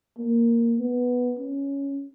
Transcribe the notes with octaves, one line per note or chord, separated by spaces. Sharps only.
A#3
B3
C#4